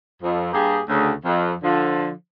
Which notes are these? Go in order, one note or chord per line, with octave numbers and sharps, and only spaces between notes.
F2
G2 A#3 G4 G#4
D2 C#3
F2
D3 F3